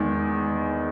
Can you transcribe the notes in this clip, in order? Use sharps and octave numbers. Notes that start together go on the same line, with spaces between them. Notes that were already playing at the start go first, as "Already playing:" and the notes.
Already playing: E2 D#3 G#3